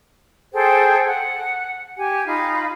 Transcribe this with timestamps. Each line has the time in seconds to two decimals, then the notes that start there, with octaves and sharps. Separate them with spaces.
0.53 G#4 A4 C5 G5
1.05 F#5
1.97 G4 G#5
2.25 D#4 F4 B5